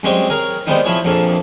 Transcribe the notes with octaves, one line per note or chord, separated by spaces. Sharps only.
F#2 G3 G#3 C4 C#5 D#5
G#4 A#4 C#5 A#5
D#3 G3 G#3 B3 C4 D#4
F3 E4 G#4 C#5
A#1 F2 A#3 G#4 A4